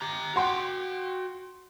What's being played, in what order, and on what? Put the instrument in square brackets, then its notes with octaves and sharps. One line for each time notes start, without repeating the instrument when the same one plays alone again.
[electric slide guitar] G4 A#5
[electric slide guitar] F#4 G5 [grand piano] F#5 C6